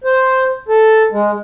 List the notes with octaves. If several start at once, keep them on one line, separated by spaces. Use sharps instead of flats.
C5
A4
G#3